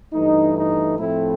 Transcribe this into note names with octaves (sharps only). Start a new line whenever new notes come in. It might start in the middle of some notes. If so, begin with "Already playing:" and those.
G2 E3 A3 D#4
D#4
A2 F3 A3 C4 E4